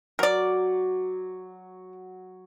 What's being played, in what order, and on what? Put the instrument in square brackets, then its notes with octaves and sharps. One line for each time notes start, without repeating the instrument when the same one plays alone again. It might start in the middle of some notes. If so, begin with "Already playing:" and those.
[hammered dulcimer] F#3 [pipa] A#4 D5